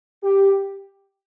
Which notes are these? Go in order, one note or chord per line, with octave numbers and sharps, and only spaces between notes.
G4